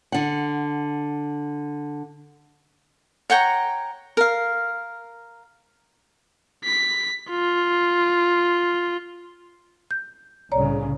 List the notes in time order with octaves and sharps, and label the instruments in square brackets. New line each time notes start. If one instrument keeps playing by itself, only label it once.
[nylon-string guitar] D3 F#5
[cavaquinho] C#5 F#5 G5 A#5
A#4 F5
[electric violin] B6
F4
[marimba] G6
[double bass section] C2 A2 C#3 [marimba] C#5 D5 A#5